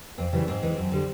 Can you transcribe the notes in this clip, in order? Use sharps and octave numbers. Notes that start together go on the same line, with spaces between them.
F2 C4
C#3 E3 G3
G#2 C4
E3 G#3
F#2
D3 G3